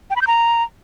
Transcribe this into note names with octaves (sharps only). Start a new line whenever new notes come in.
G5
B5
G6
A#5